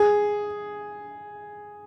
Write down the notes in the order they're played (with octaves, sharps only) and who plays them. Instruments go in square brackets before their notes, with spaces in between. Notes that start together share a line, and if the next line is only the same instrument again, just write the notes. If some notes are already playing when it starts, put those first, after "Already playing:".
Already playing: [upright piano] G#4